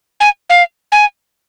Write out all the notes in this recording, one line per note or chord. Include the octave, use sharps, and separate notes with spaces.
G#5
F5
G#5